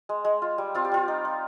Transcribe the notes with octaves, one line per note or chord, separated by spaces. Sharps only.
G#3
G#3
F4
G3
C4 F4
G4
G3 F4
D#4
D#4